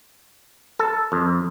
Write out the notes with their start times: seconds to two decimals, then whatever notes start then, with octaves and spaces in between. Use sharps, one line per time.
0.79 A4
1.12 F2